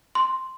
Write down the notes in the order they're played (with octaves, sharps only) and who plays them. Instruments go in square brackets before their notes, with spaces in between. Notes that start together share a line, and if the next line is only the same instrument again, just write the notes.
[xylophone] C6